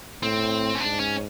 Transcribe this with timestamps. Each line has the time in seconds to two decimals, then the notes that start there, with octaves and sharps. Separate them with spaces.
0.22 A2 C4
0.75 C#4
0.80 G#2 D4
1.00 C#4